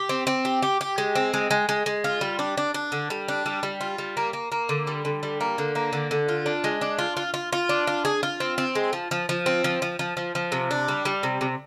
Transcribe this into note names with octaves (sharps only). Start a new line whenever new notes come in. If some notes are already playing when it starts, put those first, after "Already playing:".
Already playing: G4
C4
C4
G4
G4
G4
G#3
C4
G#3
G#3
G#3
G#3
F4
G3
D4
D4
D4
D3
G3
D4
G3
G3
F4
G3
A#3
A#3
A#3
D3
G3
D3
G3
A#3
D3
A#3
D3
D3
F4
D4
G#3
D4
F4
F4
F4
F4
D4
F4
G#4
F4
C4
C4
G#3
F3
F3
F3
C4
F3
F3
F3
F3
F3
C3
D4
G3
G3
C3
C3